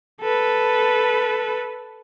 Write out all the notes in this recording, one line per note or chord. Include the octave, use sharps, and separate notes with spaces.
A4 B4